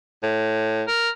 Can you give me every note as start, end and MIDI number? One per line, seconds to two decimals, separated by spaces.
0.23 0.83 45
0.88 1.09 70